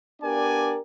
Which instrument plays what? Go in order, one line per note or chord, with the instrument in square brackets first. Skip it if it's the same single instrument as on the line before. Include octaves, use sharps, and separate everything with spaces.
[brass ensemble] B3 D4 G4 A#4 D5 G#5